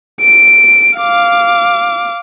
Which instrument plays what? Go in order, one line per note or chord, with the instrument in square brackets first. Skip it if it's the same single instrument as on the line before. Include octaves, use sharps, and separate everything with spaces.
[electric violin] D7
F5 D6